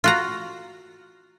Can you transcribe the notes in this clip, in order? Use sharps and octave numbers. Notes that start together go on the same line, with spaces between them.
F4 F#4 A#5